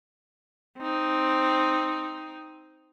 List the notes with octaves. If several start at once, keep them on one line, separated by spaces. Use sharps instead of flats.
C4 D#4